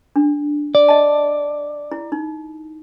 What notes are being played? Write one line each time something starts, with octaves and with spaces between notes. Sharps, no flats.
D4
D5
D#5 A5
E4
D#4